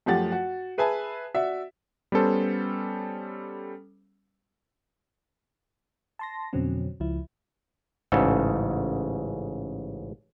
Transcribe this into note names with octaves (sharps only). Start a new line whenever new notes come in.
F#2 F3 A3 G4 F#5 A6
F#4
G#4 B4 E5 G#5 A5
F#4 D5 E5
G3 B3 C#4 A4 C5
A5 C6 A#6
F2 B2 D3 F#3 C4 C#4
C#2 F3 E4
A1 G#2 C#3 A4